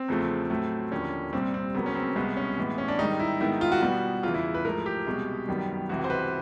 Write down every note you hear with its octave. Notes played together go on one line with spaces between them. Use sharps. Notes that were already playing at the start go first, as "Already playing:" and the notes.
Already playing: C4
E2 C#3 F3 A3
A2 F#3 A3
D#2 D3 F3 A#3 C#4
C2 A#2 G3 C4
C4
C#2 C#3 F#3 A#3 B3
C#4
C4
C2 B2 G#3 B3
C#4
A2 E3 G#3 B3
C#4
D4
G#2 D#3 G3 D#4
E4
G#2 D#3 G#3 B3 E4
F4
F#4
B2 G3 B3 F#4
E2 C#3 E3 F4
E4
B4
G#2 F3 A3 A#4
G4
C2 B2 G#3
F#2 D#3 G3 B3
C#2 C3 E3 G#3 F#4
C5
B4